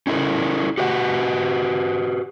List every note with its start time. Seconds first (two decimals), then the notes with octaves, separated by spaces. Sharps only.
0.07 C#4 E4 A4 A#4
0.78 F#4 G4 B4 D#5 F#5